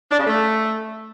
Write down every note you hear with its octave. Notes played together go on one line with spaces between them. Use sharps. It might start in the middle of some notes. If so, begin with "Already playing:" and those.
D4
C#3
A3